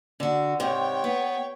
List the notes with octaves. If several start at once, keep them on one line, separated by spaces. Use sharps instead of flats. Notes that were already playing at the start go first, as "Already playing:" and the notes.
D3 F#4
G#2 C3 C#5 G5
B3